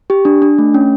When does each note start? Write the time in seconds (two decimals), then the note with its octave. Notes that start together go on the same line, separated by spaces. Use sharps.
0.10 G4
0.25 D4
0.42 D4
0.58 A3
0.74 C#4